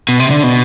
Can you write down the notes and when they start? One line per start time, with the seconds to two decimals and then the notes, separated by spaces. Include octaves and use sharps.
0.09 B2
0.20 C3
0.31 D3
0.43 B2